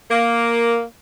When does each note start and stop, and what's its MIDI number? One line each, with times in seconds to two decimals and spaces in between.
0.11 0.83 58